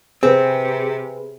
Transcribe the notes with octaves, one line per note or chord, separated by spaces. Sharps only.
C3 C4 G#4 B4